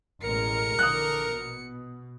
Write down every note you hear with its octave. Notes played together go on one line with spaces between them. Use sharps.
A1 B2 G#3 A#4 C#7
A#1 D3 E3 D#6 F#6
B2